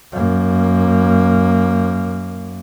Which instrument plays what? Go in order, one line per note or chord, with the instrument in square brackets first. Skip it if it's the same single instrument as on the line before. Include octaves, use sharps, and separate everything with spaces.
[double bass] F#2 A#3